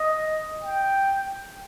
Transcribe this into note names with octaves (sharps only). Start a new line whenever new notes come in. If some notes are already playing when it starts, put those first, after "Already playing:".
Already playing: D#5
G5